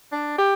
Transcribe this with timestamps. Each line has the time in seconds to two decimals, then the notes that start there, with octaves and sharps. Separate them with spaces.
0.12 D4
0.38 G4